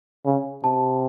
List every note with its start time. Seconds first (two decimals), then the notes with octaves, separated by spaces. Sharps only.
0.26 C#3
0.64 C3 A5